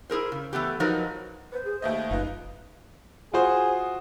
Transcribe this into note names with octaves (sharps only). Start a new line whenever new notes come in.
E4 G#4 A#4 C5
C#3
E3 A3 B3 G4
F3 F#3 D#4 F#4 A#4 B4
B4 C5
G#4
D#2 A3 D#5 E5
F#1 D#4 F4 B4 D#5
F4 F#4 G#4 C5